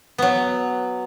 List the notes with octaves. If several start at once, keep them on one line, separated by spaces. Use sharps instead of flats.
F#3 B3